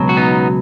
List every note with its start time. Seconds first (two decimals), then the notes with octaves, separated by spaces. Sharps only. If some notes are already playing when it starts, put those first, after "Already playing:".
Already playing: C#2 B2 F#3
0.09 F#4
0.17 B3 D#4